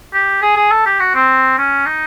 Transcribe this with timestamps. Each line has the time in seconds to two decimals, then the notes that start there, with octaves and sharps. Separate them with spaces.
0.13 G4
0.42 G#4
0.56 G#4
0.71 A4
0.86 G4
1.00 F#4
1.15 C4
1.58 C#4
1.86 D#4